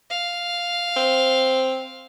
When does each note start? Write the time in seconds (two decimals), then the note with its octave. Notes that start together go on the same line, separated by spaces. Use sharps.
0.10 F5
0.97 C4